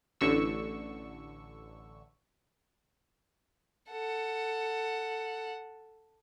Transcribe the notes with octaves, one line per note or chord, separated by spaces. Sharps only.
A1 D3 C#6 E6
A4 F#5